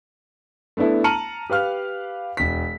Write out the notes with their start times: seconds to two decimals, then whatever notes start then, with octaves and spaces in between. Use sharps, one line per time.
0.77 A3 B3 D4 E4 A4
1.04 A5 A#5 F6 C#7 D#7 F#7
1.50 G4 B4 F5 F6
2.37 E1 B6